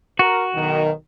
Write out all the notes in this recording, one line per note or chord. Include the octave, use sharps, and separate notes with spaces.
F#4 A#4
B1 D#3